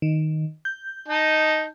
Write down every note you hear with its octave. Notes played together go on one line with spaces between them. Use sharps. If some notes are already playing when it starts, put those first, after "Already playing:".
D#3
G6
D#4 D#5 A5